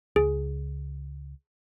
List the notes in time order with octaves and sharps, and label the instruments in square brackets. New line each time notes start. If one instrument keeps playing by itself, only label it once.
[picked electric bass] C#2 [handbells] G#4